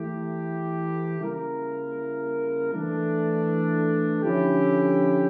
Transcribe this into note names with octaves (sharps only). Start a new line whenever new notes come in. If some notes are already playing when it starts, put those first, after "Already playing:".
Already playing: E3 A3 E4 G4
C#3 G3 A#3 E4 A#4
E3 A3 D4
D3 F3 C#4 E4 G4